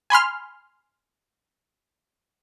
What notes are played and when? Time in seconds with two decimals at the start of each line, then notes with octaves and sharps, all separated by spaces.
0.10 G#5 B5 C6 F6